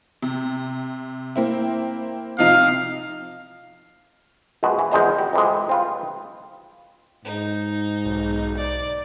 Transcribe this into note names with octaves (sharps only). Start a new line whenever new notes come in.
C3
A#3 C4 E4
C3 F3 D#4 F5
A#1 B2 G#3 F#4
E3
A#1 E2 G#3 C5 D#5 A#5
F#4 G4
F2 C3 E3 G#3
C4 F4 B4
G#2 D#4
B1
D5